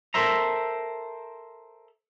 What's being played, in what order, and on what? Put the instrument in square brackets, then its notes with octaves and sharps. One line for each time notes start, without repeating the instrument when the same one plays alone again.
[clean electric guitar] A4 A#4 C5 E5 A#5